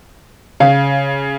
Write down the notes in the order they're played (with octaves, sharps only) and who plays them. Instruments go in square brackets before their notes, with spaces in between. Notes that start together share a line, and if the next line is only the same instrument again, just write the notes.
[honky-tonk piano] C#3 [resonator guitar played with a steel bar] F5